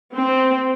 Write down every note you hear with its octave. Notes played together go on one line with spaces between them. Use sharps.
C4